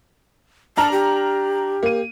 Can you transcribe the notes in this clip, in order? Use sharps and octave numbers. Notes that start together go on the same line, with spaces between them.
D4 A5 A#5 F6
G4
A#3 D#7